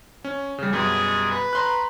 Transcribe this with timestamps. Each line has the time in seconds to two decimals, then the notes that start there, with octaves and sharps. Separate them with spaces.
0.24 C#4
0.58 C#3 G3
0.73 F#2 B2 G3 G#4
1.31 B4
1.53 A#5 C6 F#6